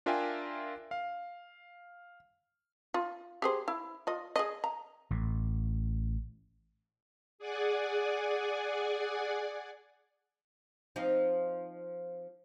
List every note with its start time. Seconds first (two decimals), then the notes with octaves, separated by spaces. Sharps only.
0.06 D4 F4 A#4 E5 G5 G#5
0.91 F5
2.94 F4
3.42 G4 G#4 C5
3.68 E4
4.07 F4 D#5
4.36 G#4 D#5
4.64 A#5
5.10 A1 A2
7.39 G#4 D5 F#5 G#5
10.96 F3 C4 D#4